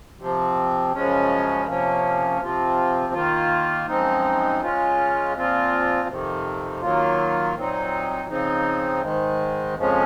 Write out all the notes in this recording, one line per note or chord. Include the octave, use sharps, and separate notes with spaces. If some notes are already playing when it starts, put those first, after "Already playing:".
C3 F3 C4
F#2 C#3 F3 G#3 C#4
C3 F3 A#3 C#4
C3 F3 C4 F4
D#3 A#3 F4
F#2 F3 G#3 C4 D#4
C#3 G#3 C#4 F4
A#2 F3 C4 F4
F2 C3 D#3
D#3 F#3 A#3 F4
A#2 F#3 C4 D#4
C#3 F3 C4 D#4
G#2 D#3 G#3
F2 C#3 F3 G#3 C#4